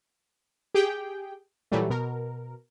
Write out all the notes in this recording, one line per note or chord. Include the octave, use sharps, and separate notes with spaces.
G4 G#4 G5
A#2 E3 F#3 G3 A3
B2 A#4